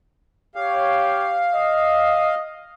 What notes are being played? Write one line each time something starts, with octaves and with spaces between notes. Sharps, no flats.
G4 C#5 F5
D#5